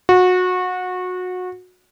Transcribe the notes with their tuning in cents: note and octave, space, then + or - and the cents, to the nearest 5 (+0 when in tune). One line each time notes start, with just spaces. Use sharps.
F#4 -25